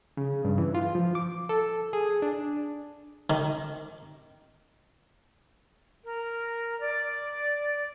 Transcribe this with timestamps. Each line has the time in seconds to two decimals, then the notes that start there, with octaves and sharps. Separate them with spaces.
0.17 C#3
0.45 G2
0.58 E3
0.75 F4
0.95 F3
1.15 D6
1.49 A4
1.93 G#4
2.22 D4
3.30 D#3
6.04 A#4
6.80 D5